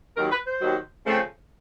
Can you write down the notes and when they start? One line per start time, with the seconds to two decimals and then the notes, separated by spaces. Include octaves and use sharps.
0.17 D#2 D#3 F#3 A#4
0.31 B4
0.46 C5
0.61 D#2 D#3 F#3
1.05 C#3 F3 A3 C4